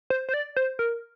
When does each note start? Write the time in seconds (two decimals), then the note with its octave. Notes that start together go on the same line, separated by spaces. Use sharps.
0.10 C5
0.29 C5
0.34 D5
0.57 C5
0.79 A#4